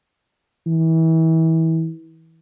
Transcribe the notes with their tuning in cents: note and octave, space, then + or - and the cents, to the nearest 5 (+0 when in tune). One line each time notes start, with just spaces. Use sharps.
E3 -30